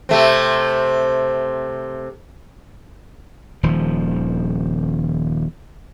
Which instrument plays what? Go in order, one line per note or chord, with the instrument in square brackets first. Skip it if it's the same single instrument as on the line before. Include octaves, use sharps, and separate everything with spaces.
[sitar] C3 A3 C4
[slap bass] D#1 D#3 F3